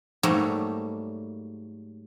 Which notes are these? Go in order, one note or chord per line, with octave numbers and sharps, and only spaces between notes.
G#2 F#3 G3 A3 A#3